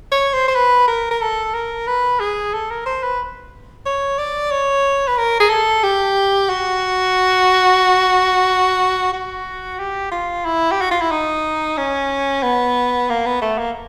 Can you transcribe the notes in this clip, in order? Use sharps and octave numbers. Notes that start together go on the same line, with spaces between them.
C#5
C5
C5
B4
A#4
A#4
A4
A#4
B4
G#4
A4
A#4
C5
B4
C#5
D5
C#5
B4
A#4
G#4
A4
G4
F#4
F#4
G4
F4
E4
G4
F#4
F4
E4
D#4
C#4
B3
A#3
B3
A3
A#3